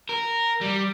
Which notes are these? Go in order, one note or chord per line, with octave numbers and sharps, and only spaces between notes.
A#4
G3